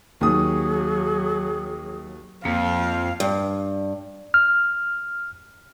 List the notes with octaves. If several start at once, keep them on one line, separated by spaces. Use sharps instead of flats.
D#2 F#3 G#4 D#6
F2 A#3 F5
G2
F6